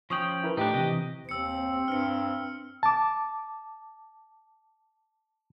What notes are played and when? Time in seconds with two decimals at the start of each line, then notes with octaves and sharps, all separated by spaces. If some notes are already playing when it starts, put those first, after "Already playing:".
0.10 F3 C#4 G5 C#6 D#6 F#7
0.44 E4 A#4 B4
0.57 A2 D4 D#4 G4
0.74 C3 E3 D#5
1.29 D#2 C4 E6 C#7
1.88 G2 F6 C#7
2.83 A5 D6